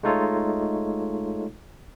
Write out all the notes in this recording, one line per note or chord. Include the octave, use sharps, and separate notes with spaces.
G#3 A3 D#4 F4 A4 C#5